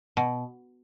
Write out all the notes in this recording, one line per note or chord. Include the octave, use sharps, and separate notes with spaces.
B2